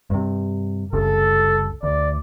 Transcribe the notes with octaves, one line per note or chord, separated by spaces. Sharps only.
G2 C3
F#1 C2 C#3 A4
D2 D5